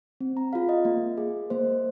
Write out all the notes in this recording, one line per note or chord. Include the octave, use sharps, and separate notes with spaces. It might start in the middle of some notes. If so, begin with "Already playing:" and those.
C4
A#5
F4 G#4 F5
D#5
A#3
G#4
A#3 C5